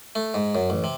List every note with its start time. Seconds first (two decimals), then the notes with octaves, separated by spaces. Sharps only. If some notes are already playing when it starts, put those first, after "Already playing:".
0.15 A3
0.34 G#2
0.55 F#2
0.70 A1
0.84 C3